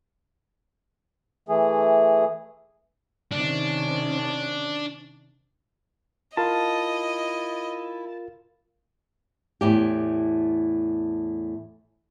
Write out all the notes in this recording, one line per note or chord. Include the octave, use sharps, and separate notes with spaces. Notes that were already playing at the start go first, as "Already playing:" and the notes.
E3 A3 G#4
C3 D#3 C#4 D4
E4 F4 A#4 D#5 F5 A5
E2 A2 G4